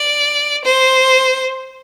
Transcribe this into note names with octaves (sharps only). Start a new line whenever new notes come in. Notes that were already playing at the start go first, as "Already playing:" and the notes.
Already playing: D5
C5